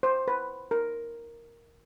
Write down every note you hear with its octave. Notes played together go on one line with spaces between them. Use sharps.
C5
B4
A#4